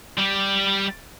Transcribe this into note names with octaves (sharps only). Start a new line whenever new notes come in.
G3 G4